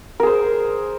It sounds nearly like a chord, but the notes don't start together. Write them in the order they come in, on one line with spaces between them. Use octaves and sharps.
A#4 G#4 C5